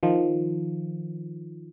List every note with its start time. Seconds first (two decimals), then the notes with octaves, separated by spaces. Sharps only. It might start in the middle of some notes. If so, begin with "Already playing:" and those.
0.03 D#3 F3